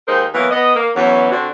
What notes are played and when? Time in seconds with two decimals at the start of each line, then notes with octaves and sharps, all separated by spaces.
0.08 D#2 G#3 D#4 A#4 C5
0.34 E3 F#3 A#3 B3
0.51 B3 D#5
0.76 A#3
0.96 E2 E3 F#3 B3 C#4
1.32 D3 C4 D4 F#4